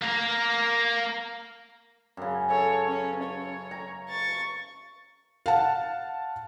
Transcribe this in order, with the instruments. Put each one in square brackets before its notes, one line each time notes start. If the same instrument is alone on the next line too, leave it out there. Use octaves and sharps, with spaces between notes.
[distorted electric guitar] A#3 A#4
[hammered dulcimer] F#2 C#3
[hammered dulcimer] A4 [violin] C#5
[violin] C#4
C#5
[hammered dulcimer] A#5
[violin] C#6 A6
[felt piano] F5 F#5 A5